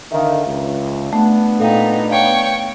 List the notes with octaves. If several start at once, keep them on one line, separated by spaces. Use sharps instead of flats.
D3 D#3 E5 F5
C#2
A3 B3 D4
A#2 D#4 A4 F5 G5
C#5 F5 G5 C#6